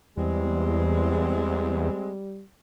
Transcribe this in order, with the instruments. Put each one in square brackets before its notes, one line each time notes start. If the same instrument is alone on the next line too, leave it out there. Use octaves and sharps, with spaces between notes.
[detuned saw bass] E2 [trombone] G3 [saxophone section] G#3 C4